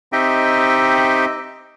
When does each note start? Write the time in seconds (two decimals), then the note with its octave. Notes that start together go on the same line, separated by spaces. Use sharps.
0.13 C4 D#4 G4 D#5 E5 G5